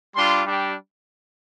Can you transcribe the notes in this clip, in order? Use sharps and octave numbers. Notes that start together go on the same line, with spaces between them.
G3 D4 F4 C6
G3 D4 G4